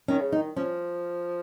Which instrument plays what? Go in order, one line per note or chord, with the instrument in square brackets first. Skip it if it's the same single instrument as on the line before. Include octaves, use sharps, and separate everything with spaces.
[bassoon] D#3 [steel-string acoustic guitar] C#4
[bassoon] C#3
[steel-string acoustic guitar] D#4
[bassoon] D#3
[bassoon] F3 [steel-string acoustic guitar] C#4